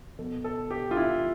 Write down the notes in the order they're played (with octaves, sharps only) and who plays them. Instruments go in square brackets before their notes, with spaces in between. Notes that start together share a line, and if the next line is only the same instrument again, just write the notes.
[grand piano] B2 A4
A4
G4
F4
E4